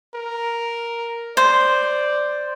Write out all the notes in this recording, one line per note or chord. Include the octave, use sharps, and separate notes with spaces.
A#4
C5 D5